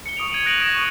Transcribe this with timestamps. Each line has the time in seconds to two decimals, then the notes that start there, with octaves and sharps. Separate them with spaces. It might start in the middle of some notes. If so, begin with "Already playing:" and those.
0.06 C#7 G7
0.17 C#6 D#6 D7 F7
0.32 G#6 D#7 F#7
0.46 F#6 A#6 D7 F7 F#7
0.60 D#6 G#6 A#6 D#7 E7
0.74 C#6 D#6